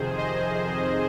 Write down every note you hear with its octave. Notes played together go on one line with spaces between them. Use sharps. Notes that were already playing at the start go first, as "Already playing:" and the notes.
Already playing: F2 C3 D#3 G#4 C5
C5 D#5